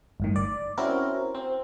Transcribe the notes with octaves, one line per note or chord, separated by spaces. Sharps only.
G1 A2 D#3
D5
C4 C#4 E4 F#4 A#4
C4